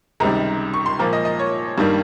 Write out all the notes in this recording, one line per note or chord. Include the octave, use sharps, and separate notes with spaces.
C#2 C3 D#3 G3 A#5
C#6
C6
A#2 F3 A#3 A#5
D#5
D#5
C#5
G2 D#3 G3 A#3